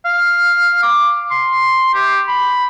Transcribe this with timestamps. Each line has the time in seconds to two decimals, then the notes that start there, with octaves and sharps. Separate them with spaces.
0.05 F5
0.83 D6
1.31 C6
1.94 G4
2.28 B5